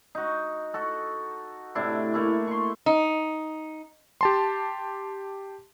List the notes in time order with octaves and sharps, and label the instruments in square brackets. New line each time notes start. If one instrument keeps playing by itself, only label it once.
[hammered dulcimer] D#4 F#4
F#4 A4
A2 C3 D4 E4
A3 A#3 E4 A4
C6 C#6
[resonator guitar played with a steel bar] D#4
[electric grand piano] G4 A5 C6